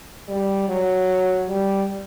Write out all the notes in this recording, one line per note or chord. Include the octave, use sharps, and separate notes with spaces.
G3
F#3
G3